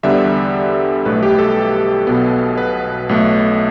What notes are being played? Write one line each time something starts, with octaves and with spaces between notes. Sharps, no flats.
E2 D3 G3 B3 E5
B1 A2 A3 B4
G4
A4
B1 B2 B3
B4
B1 A2 A3